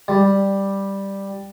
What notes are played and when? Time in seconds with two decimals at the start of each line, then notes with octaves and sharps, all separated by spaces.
0.08 G3